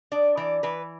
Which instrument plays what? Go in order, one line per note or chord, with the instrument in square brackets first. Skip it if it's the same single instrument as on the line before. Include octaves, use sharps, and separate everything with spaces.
[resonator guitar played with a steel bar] D4 D5
E3 D5
E3 B4